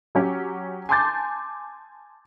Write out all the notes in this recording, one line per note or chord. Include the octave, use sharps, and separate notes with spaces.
F#3 C#4 G4
G#5 A5 C6 D6 G6 A6